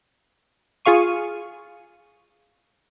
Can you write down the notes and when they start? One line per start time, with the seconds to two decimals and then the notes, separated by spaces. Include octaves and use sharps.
0.85 F4 G#4 F5 C#6 D#7